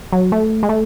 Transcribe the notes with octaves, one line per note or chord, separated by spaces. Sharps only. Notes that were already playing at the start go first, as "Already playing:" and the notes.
F#3
A3
G#3
A3